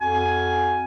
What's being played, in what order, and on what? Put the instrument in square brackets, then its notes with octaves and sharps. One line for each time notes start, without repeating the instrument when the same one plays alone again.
[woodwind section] F2 F#4 G#5